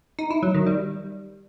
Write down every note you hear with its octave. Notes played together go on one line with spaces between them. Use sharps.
D#4
E4
F#3
D#3
G3